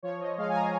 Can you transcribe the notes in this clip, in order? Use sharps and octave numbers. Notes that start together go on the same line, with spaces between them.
F3 C#5
F3 D#5
G#3 F5
G#5
F3 A#5